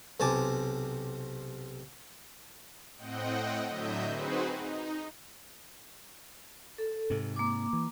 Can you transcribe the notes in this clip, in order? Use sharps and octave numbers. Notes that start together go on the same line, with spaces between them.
B1 C3 G#5 A5 D6
A2 C4 D#5 F#5 G5
A2 D3 F#3 D#5 E5 G6
C4 D#4 F#4 G#4 B4 C5
D#4
A4
G#2 C3
A#3 D6
E3